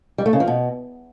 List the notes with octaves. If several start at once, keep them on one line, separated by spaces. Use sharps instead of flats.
G3
A3
C#3
F3
B2